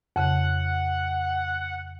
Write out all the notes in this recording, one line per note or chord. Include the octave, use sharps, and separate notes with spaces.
F2 C#3 F#5 F#6